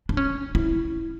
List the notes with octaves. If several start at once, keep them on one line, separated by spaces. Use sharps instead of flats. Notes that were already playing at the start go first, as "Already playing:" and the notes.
D4
C#4
E4